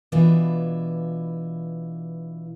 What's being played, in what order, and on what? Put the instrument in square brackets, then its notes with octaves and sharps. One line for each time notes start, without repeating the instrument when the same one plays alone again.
[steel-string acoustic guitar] B2 E3 D4 E4 F4 B4